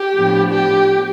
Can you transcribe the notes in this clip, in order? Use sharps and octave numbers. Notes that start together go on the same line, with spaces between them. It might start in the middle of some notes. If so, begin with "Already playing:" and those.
Already playing: G4
A2 F3 B3 D4
G4